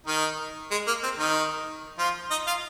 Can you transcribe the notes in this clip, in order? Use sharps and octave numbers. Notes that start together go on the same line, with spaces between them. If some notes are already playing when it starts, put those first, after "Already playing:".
D#3 D#4
G#3
A#3
C4
D#3 D#4
F3 F4
D#4 D#5
F4 F5